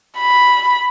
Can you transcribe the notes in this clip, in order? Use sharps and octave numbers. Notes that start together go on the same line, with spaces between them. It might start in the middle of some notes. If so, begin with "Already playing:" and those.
B5